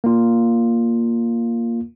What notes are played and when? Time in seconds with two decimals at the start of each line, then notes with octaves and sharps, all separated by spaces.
0.04 A#3 F4